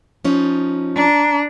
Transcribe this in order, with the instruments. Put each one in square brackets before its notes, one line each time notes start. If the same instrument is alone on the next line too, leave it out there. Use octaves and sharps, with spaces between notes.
[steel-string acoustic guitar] F3 C#4 D#4
[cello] D4 [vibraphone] A5 A#5